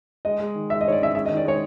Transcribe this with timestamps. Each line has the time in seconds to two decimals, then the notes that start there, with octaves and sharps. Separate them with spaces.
0.25 G#3 D#5
0.40 G#3
0.55 D#3
0.70 G#3 E5
0.81 D#5
0.85 D#3 C#5
0.92 D5
1.00 C#4 E5
1.15 G#3 E5
1.26 D#5
1.30 D#3
1.37 D5
1.45 G#3 C#5